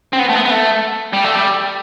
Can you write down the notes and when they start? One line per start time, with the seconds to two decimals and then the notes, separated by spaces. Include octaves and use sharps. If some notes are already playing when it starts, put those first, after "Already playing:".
0.13 C4
0.19 B3
0.30 A3
0.35 B3
0.45 B3
0.50 A3
1.13 G3
1.24 A3
1.35 G3